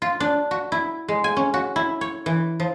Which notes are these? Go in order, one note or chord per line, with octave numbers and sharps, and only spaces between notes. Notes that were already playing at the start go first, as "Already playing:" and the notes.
F4
D4
F#4
E4
G#3
G#5
C#4
F#4
E4
C#5
E3
F3